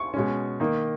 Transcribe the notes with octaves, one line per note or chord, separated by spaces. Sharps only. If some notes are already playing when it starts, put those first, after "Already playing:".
Already playing: C#6
B2 G#3 C#4
D#3 A#3 D#4